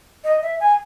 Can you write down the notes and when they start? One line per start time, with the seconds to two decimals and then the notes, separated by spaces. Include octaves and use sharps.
0.24 D#5
0.43 E5
0.60 G#5